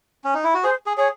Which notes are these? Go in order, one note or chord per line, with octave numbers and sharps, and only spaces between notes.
C#4
D#4
E4
F#4
G#4 C5
G#4
G#4 C#5